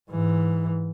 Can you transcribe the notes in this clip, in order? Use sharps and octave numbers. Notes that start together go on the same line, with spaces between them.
G#2 E3